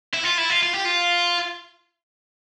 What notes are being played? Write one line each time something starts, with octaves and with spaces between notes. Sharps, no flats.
E4
F4
E4
F4
F4
G4
F4